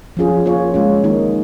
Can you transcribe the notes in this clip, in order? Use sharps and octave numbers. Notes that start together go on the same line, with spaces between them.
F3 C#4 F4 G#4
A#3 F4 C#5
G#3 C#4 F4
D#3 A#3 D#4